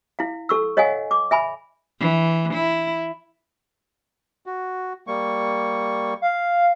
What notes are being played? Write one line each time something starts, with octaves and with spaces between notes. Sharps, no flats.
E4 F5
A4 C#6 E6
C#5 D#5 F5 F#5 G#5
D6
E5 G#5 B5
E3
E4
F#4
G3 A#3 C#6
F5